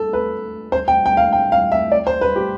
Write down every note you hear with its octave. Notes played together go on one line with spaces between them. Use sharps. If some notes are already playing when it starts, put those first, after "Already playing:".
Already playing: A4
B4
C5
G5
G5
F5
G5
F5
E5
D5
C5
B4
G4